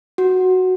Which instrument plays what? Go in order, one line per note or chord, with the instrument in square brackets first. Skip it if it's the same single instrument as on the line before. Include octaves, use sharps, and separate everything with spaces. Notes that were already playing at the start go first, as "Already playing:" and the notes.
[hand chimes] F#4